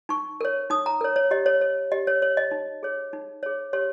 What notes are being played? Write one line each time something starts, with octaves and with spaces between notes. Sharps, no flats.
D#4 C#6
A#4 C#5
D#4 D#6
A#5
A#4 C#5
C#5
G4 D#5
C#5
C#5
G4 D#5
C#5
C#5
D#5
D#4
G#4 C#5
D#4
G#4 C#5
G4 C#5